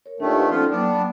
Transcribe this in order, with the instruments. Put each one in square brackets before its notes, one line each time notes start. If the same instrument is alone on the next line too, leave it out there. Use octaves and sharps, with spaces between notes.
[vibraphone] A#4 C#5
[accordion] A#2 D#3 A3 [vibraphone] D4 G4
[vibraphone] B4 D5 F#5
[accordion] F3 B3 F4 [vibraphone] C#4 D#4 A4
[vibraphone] F#3 A#3 G5 [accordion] B3 D4